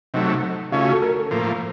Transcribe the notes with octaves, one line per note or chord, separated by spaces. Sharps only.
C3 F#3 A3 D#4
C#3 A3 C#4 F4
F#4
A4
A#4
A2 F3 A#3